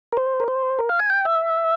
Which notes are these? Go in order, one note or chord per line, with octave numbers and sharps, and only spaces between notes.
A#4
C5
A#4
C5
A#4
F5
G#5
G5
E5